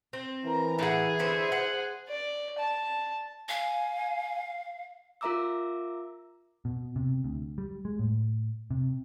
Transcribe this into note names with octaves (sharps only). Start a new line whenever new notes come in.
C4
E3 A#4 A#5
A2 G#4 E5 F#5
D3 B4 C5 E5
C5 F#5
D5
A5
F5 G#5
F4 A#4 E5 A#5 D6 E6
B2
C3
D2
G3
G#3
A2
C3